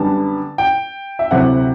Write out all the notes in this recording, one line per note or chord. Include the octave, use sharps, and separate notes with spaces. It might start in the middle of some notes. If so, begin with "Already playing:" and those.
Already playing: F#2 D3 G3 B3 A5
G5
E5
D2 C3 F#3 C4 E4 F#5